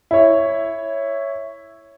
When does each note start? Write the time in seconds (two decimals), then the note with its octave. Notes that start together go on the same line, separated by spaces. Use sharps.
0.11 E4 C#5